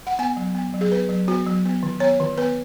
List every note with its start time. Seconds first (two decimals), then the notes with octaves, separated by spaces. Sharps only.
0.07 F#5
0.19 B3 G#5
0.37 F#3
0.55 B3
0.74 F#3
0.81 G#4
0.92 B3 B4
1.09 F#3
1.28 B3 F#4
1.47 F#3
1.65 B3
1.83 D#3
2.00 B3 C#5
2.20 D#3
2.38 B3 B4